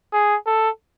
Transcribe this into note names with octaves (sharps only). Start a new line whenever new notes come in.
G#4
A4